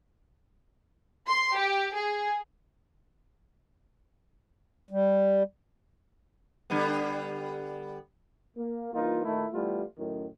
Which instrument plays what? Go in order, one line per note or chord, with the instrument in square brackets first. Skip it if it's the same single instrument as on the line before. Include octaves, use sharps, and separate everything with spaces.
[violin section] C6
G4
G#4
[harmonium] G3
[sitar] D3 G3 B3
[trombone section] A#3
G2 E3 A#3 D#4 F4
A#2 D#3 A3 D#4 E4
E3 G3 A3 B3 E4 F4
F#2 A2 D#3